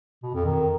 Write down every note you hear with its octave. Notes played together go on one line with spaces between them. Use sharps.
B2
F2
D#3